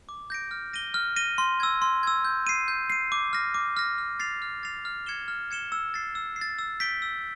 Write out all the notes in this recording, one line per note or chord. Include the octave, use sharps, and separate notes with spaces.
D6
G6 A#6 D7
F6
A#6 D#7 G7
F6
A#6 D#7 G7
C6
E6 G#6
C6
E6 G#6
G6
C7 D#7
G6
C7 D#7
D6
F6 A#6
D6
F6 A#6
F6
A6 C7 F7
F6
A6 C7 F7
F6
G#6 C#7 E7 G7
F6
G#6 C#7 E7 G7
E6
A6 C7
E6
C7
A6
E6
G6 B6 D7 G7
E6